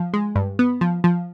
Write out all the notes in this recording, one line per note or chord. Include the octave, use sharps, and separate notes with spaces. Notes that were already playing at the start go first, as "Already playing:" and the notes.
Already playing: F3
G#3
G2
B3
F3
F3